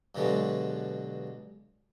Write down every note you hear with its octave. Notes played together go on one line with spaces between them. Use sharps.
G2 B2 D3 F#3 G#3